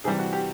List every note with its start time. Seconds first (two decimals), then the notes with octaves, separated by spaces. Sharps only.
0.04 C3 E3 G3 G#4
0.19 F#4
0.33 G4